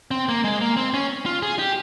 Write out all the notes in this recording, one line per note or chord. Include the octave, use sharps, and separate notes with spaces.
C4
A#3
G#3
A#3
C4
C#4
F4
G#4
G4